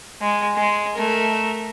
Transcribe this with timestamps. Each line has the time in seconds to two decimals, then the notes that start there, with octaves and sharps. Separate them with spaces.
0.22 G#3
0.56 G#3
0.95 A3 A#4